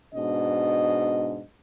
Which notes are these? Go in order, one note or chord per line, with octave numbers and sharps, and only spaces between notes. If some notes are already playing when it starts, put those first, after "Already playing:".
G#2 B2 D4 D#5